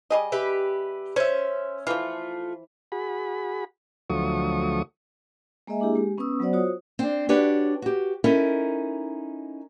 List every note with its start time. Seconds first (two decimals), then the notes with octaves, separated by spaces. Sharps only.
0.10 G3 G#4 D#5
0.32 G4 B4 E5
1.16 C#4 C5 E5
1.87 E3 F3 A3 F4
2.92 F#4 G#4 B5
4.10 D2 F3 F#3 A3 C#6 D#6
5.67 G#3 A#3 G#4 D#5 E5 G#5
5.80 A#3 D4 E4 G4 G#4
5.96 G#3 G4
6.18 B3 C#4 B4 C#6 D#6 E6
6.40 F#3 B3 F#4 C5 D5 F#5
6.53 F4 F#4 C5 C#5 D#6
6.99 C4 D4
7.29 D4 F#4 G4 B4 C#5
7.82 F#4 G4
8.24 C#4 D#4 E4 A4 A#4